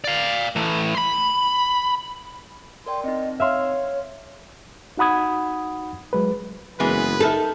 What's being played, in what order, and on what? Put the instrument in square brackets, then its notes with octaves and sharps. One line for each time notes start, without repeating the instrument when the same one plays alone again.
[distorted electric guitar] D5 F5
E3 A3
B5 C6
[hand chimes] A#4 D5 G5 [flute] C6
[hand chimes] C4 D#4 [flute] D#5
[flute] C#5 [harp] E5 F5 C6
[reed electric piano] D#4 F#4 F#5 B5 D#6 G#6
F#3 G#3 B4
[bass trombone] F#1 [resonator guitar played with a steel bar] E3 G#3 B3 [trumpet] B4
[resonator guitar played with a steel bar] D#4 A#4 E5 [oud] A4